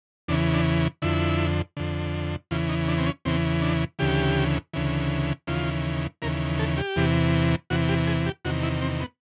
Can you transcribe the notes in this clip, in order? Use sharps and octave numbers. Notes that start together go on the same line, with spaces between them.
E2 C#3 E3 D4
D4
F2 D3 E4
F2 D3
E2 C#3 E3 F4
D#4
D4
C4
C#4
E2 C#3 E3 C4
D4
D2 C#3 E3 G4
D2 C#3 E3
D#2 C#3 E3 F4
D#2 C#3 E3 A#4
A4
G4
E2 C3 E3
E2 C3 E3 F#4
G4
G#4
G4
E2 C3 D#3 F#4
E4
C4
B3